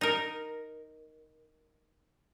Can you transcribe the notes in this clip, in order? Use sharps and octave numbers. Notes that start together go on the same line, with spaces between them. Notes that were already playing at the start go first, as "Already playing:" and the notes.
D#4 A#4